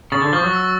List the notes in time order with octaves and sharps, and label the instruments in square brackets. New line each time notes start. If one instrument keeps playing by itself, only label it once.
[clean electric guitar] C#3 [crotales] A6
[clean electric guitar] D3
[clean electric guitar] F3 [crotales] C#6
[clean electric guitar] F#3
[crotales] E6